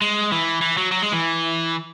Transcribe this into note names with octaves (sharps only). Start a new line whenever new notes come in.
G#3
E3
E3
F#3
F#3
G#3
E3